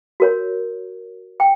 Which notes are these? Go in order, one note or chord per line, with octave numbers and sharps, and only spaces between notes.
F#4 A#4 C#5
G5